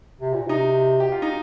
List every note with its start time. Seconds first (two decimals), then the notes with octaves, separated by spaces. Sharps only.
0.20 C3
0.34 A#2
0.47 C3 D#4
1.00 G4
1.12 F4
1.22 D#4